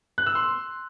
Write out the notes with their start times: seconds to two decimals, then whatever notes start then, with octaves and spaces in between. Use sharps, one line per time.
0.18 F#6
0.26 E6
0.35 C6